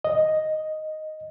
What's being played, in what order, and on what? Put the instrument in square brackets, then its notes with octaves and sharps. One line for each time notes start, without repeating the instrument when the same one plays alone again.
[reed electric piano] D#5